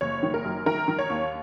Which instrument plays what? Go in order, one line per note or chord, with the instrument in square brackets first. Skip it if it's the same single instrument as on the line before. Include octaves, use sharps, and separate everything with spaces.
[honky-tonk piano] F#1 C#5
D#3
A#4
F#2
D#3 A#4
D#3
C#5
D#2